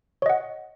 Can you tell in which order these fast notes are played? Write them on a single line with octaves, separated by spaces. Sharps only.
C#5 D#5 F#5